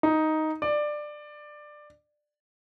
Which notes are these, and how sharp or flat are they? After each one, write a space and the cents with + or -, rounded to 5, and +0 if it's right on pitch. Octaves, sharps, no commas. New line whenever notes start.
D#4 +5
D5 +15